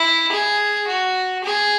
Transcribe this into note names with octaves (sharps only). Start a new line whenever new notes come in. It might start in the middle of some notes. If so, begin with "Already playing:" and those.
Already playing: E4
G#4
F#4
G#4